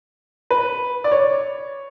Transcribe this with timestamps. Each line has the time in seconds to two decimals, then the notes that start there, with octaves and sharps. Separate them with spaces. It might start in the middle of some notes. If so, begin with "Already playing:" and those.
0.50 B4
1.04 D5
1.12 C#5